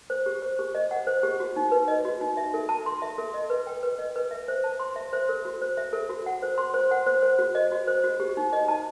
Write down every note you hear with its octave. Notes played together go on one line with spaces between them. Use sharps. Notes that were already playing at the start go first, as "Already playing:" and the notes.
C5
G4
C5
G4
D#5
F#5
C5
G4
F#4
D#4
B4
D#5
F#4
D#4
E5
A4
A5
C6
E5
A4
D#5
B4
G5
B4
D#5
B4
E5
C5
A5
C6
E5
C5
A4
F#4
C5
E5
A4
F#4
F#5
C5
C6
C5
F#5
C5
C5
F#4
D#5
F#4
C5
F#4
G4
D#4
D#5
A5